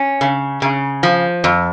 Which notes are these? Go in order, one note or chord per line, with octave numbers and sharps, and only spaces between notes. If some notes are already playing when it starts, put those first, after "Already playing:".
Already playing: C#4
C#3
C#3
F3
F2